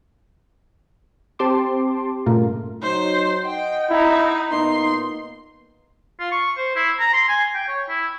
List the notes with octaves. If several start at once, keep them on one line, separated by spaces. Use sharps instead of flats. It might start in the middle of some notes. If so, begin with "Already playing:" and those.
C4 G4 A5 C6 D6
G2 A#2 C#3 A3 F4 A#4
F#3 D#4 C5
D#5 F#5 G5
D#4 E4
A#2 A#3 B3 D#4 C6
F4
C#6
C5
E4
A#5
C6
G#5
G5
C#5
E4